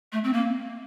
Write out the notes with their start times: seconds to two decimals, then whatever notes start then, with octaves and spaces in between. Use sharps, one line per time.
0.12 A3
0.24 C4
0.33 A#3